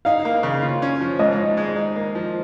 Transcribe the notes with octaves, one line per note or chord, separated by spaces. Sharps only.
D#4 F5
A#3
C#3
F4
C#4
F3
G#2 D#5
D#4
G#3
D#4
A#3
F3